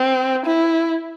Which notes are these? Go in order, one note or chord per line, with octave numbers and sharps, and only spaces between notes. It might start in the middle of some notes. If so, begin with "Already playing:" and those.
Already playing: C4
E4